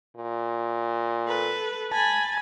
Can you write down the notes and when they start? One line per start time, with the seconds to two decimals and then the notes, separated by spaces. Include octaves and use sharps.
0.16 A#2
1.26 A4 B4
1.91 G#5 A5 B5